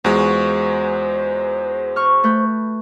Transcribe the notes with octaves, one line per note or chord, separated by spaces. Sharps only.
E2 G#3 F4 F#4 C5
C#6 F6
A3 B4 G6